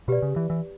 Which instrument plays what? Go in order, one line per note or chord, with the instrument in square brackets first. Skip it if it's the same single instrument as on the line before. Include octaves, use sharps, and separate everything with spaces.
[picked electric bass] B2 [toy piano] G4 B4 D5
[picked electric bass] C#3
E3
E3